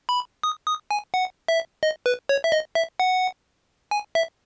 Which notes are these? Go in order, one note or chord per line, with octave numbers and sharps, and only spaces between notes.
B5
D#6
D#6
G#5
F#5
E5
D#5
B4
C#5
E5
D#5
E5
F#5
G#5
E5